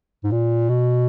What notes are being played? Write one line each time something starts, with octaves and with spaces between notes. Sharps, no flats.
G#2
A#2
B2